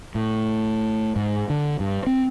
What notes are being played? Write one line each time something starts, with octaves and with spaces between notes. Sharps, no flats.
A2
G#2
D3
G2
C4